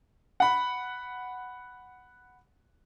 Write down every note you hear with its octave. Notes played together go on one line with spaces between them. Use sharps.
F#5 B5